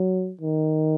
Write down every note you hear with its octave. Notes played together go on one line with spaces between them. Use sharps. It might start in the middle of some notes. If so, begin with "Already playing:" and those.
Already playing: F#3
D#3